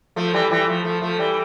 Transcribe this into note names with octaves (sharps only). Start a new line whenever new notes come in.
F3 A3
E3 G3
E3 G3
F3 A3
F3 A3
F3 A3
E3 G3